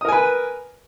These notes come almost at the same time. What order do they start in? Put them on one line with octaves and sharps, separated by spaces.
D#6 A#4 G#5 B4